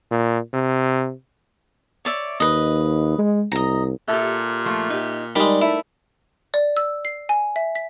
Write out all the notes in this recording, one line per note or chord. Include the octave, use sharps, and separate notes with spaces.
A#2
C3
C#5 D5 E5
D#2 B4 D#5
G#3
C2 D#5 A#5
A#2 G4 A4 E5
F3 A3 F4
D#4 G4
G3 G#3 D#4 A#4 D5 B5
A3 E4
D5
E6
C7
G#5
E5
B6